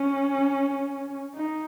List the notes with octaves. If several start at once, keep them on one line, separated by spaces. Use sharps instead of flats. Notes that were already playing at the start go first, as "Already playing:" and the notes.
Already playing: C#4
D#4